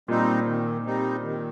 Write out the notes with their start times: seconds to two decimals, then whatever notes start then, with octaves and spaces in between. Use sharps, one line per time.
0.08 A#2 G3 C4 D#4
0.47 D#3
0.86 G3 C4 D#4
1.23 D#3